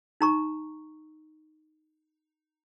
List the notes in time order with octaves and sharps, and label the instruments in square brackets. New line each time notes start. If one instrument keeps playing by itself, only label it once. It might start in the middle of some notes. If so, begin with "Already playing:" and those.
[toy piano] D#4 A#5 C#6